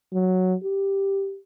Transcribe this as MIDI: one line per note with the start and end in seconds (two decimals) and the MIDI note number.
0.13 0.54 54
0.64 1.38 67